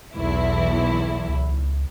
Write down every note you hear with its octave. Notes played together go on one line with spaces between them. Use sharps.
B1 E2 E4
C#2